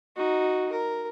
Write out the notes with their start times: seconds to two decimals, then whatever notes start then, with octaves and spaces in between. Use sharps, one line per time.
0.16 D#4 F#4
0.72 A#4